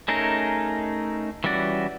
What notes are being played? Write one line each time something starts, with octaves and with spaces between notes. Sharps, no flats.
A3 C#4 D#4 G#4 A#4
E3 G3 C#4 F#4 D5